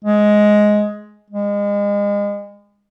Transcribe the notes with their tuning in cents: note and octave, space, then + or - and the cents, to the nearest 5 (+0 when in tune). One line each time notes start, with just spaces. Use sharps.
G#3 +10
G#3 -30